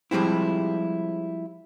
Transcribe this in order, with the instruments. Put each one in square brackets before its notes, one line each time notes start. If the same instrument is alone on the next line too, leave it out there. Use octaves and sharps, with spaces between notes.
[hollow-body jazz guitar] F3 G3 G#3 C4 E4